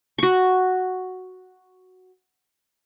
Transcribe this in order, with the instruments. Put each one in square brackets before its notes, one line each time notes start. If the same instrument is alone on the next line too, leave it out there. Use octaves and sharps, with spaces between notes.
[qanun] F#4 C#6